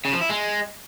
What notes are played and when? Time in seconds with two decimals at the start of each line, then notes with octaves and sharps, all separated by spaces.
0.05 C#3
0.13 F3
0.21 E4
0.29 G#3